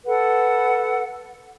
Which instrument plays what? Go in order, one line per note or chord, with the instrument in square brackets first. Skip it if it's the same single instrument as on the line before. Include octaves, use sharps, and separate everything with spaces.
[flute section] A4 B4 F#5